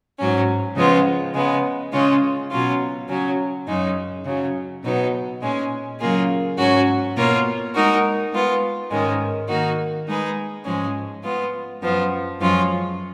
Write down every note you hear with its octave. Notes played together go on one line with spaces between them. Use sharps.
G#2 F#3 C#4
C#3 F3 G#3 B3 F4
C#3 G#3 B3
C#3 G#3 C#4 F4
B2 F#3 C#4 F4
C#3 F#3 C#4
F#2 C#3 G#3 D#4
C#3 F#3 C#4
B2 F#3 B3 D#4
A#2 G#3 C#4
C#3 F#3 A#3 F4 G#4
G#2 F#3 C#4 F#4
B2 A#3 F4 A#4 C#5
G#3 D#4 F#4 A#4
G#3 B3 F4
G#2 D#3 G#3 C#4
D#3 A#3 D#4 F#4
G#3 D#4 G#4 B4
G#2 F3 G#3 C#4 G#4
G#3 B3 F4
F#2 F3 B3 F4
F#2 F3 G#3 C#4 F4